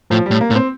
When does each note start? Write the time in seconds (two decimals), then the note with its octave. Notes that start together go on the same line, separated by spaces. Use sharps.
0.11 A2 F3
0.26 A2 G3
0.41 A#3
0.50 A2
0.55 C4